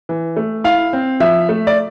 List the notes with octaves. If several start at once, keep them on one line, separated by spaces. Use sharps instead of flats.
E3
A3
E4 F5
C4
F3 E5
A3
D5